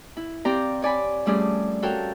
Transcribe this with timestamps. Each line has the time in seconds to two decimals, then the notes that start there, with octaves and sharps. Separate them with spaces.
0.17 E4
0.45 C4 G4 D5 F5 G5 A#5
0.82 C#5 D5 G#5 B5
1.26 F3 G3 A3 C#4 G#4 D5
1.82 F#4 A4 A#4 C#5 F5 G5